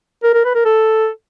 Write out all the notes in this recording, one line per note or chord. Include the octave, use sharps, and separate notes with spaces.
A#4
A#4
B4
A#4
A4